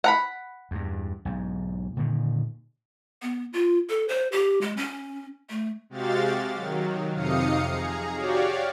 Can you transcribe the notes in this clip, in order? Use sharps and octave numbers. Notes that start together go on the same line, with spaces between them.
F#5 A#5 B5
E2 G2
B1 G#2
A#2 D3 D#3
B3
F4
A4
C5
G4
G#3
C#4
A3
C3 G#3 F#4 G4 F5 A6
D#3 F#3
F2 C3 D#4 F5 D#6 C#7
G#4 A#5
F#4 G4 C#5 D5 F5